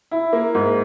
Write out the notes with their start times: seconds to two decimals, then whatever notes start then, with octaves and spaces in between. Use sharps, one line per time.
0.11 E4
0.33 A#3
0.55 G#2